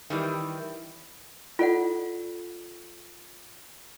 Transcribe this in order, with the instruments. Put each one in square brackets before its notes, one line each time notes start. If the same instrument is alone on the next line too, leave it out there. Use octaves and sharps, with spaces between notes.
[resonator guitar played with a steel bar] D#3 E3 G3
[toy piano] F4 A4 D5 F#5